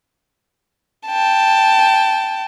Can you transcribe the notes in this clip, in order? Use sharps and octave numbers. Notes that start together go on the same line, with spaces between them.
G5 A5